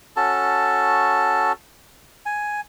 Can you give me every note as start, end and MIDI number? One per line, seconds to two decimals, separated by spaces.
0.16 1.52 61
0.16 1.52 66
0.16 1.52 69
0.16 1.52 81
2.26 2.61 80